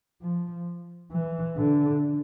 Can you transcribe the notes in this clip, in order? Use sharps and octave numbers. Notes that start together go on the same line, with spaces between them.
F3
E3
D3